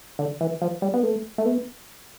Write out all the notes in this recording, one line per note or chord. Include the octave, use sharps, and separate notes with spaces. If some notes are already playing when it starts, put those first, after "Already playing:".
D3
E3
F3
G3
B3
A3
A3
B3